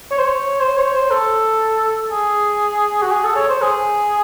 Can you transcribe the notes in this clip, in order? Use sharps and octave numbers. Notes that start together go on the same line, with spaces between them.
C#5
C5
C#5
C5
C#5
C5
A4
G#4
F#4
G#4
A4
C#5
C5
G#4